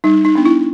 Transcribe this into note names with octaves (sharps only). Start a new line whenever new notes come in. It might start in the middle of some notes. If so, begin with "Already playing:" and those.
G3 D#4
D#4
B3 D4
E4